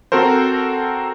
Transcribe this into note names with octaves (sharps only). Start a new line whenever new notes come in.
C4 F#4 A4 A#4 C5